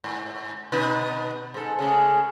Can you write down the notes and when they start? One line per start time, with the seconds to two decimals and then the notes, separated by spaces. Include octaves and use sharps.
0.04 G#2
0.72 B2 D#4 B4
1.54 G#2 A4
1.79 C#3 G#3 A3